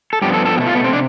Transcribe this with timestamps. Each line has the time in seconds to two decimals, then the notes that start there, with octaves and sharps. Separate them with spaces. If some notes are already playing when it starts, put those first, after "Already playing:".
0.13 A4
0.22 G2 F3 B3 G4
0.34 A4
0.46 A4
0.57 B2 G4
0.60 A3
0.67 F4
0.75 B3
0.84 C4
0.93 C3 D4